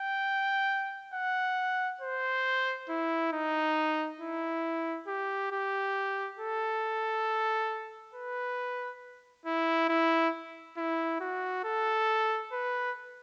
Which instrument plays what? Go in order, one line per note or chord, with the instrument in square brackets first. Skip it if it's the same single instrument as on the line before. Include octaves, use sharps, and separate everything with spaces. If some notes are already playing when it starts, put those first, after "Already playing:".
Already playing: [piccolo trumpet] G5
F#5
C5
E4
D#4
E4
G4
G4
A4
B4
E4
E4
E4
F#4
A4
B4